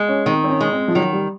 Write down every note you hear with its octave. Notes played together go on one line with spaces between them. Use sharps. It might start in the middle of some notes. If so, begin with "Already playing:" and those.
Already playing: G#3
C#4
D#3 C4
C4
C#4
G#3
C4
F3
D#3 F#3
G3